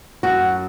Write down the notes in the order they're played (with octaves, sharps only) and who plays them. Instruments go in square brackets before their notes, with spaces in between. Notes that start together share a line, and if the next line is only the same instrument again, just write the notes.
[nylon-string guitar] F#2 F#4